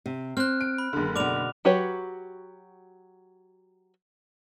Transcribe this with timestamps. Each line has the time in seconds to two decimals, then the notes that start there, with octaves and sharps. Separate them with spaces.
0.06 C3
0.37 C4 F6 F#6
0.61 D7
0.78 B5
0.93 F#1 D3
1.16 B2 D5 D6 F6 F7
1.65 F#3 F#4 G4 B4 C#5